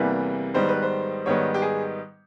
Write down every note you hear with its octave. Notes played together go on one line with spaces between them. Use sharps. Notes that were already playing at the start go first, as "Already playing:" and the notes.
Already playing: E2 C3 E3 G3 A#3 B4
G#2 D#3 G3 B3 C5
B4
C5
G#2 D#3 G3 B3 C#5
G4
G#4